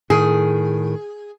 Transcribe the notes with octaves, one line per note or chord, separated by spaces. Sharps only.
A2 D#3 G#4